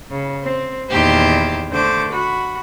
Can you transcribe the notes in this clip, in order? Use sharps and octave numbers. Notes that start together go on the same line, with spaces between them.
C#3
C4
E2 A#2 D#3 E4 G4 C5
D3 A3 C5 D6
F#4 B5